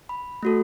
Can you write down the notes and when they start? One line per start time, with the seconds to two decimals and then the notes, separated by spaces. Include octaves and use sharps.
0.09 B5
0.43 A3 F#4 A4